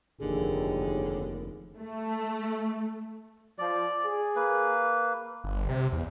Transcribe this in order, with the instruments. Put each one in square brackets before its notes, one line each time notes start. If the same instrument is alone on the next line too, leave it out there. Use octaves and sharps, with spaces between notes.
[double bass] F1 [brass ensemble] D#2 [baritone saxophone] D3 [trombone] G#4
[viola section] A3
[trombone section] F3 [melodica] D5
[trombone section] G#4
[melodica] A#3 B4
[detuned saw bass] G1
C3
E2